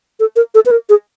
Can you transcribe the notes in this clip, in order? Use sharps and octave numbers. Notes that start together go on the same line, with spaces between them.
A4
A#4
A4
B4
A#4
G#4